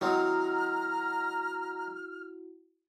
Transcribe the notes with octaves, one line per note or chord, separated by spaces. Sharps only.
D#3 F#3 C4 E4 F#4 A#5 F6